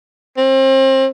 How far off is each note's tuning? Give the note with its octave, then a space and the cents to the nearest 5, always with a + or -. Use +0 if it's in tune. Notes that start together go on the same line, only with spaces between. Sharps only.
C4 +30